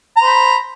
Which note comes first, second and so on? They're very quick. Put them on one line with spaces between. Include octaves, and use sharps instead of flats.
A#5 C5 B5